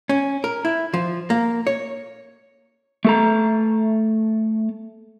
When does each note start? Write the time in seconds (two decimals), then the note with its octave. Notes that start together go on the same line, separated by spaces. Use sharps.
0.09 C#4
0.44 A#4
0.65 E4
0.94 F3
1.30 A#3
1.67 C#5
3.05 A3 A4 A#5